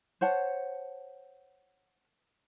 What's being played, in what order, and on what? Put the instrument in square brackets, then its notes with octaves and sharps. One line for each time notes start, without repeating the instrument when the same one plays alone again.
[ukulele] C5 C#5 F#5 A5